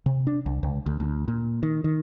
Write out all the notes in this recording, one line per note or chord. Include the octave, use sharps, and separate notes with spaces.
C3
D4
C2
C#2
D2
D2
A#2
D#3
D#3